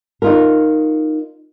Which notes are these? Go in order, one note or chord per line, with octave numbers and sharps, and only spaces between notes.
D#4 F4 A#4